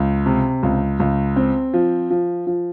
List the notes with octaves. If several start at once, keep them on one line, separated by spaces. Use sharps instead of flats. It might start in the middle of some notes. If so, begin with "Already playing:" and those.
Already playing: C#2
C3
C#2
C#2
C4
F3
F3
F3